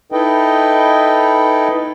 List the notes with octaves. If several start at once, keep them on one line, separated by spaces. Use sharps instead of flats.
D#4 E4 A4 B4 D#5 G5